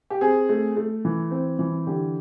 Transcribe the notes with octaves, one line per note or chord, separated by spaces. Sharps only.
G4
C4 G#4
A3
A3
E3
C4
E3
D3 G4